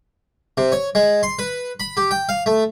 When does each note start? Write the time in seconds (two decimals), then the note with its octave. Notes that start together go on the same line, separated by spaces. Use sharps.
0.57 C3
0.72 C#5
0.95 G#3
1.23 C6
1.39 B4
1.80 B5
1.97 G4
2.11 G5
2.29 F5
2.46 A3